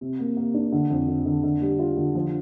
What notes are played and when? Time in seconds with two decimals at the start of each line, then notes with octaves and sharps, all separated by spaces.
0.01 C3
0.19 A#3
0.37 A#3
0.54 D4
0.72 D3
0.90 F2
1.08 D3
1.25 D3
1.43 D3
1.61 G3
1.79 F4
1.97 D3
2.15 F3